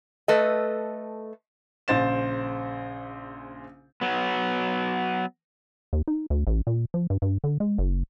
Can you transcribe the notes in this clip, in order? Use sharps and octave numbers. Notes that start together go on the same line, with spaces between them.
A3 A4 B4 D#5
A#1 C#3 C5 A6 E7
F#3 B3
D#2
D#4
D2
A1
A#2
F3
G2
G2
D3
G#3
F#1